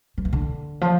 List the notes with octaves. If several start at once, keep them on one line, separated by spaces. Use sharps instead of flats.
F3
E3
D3
F3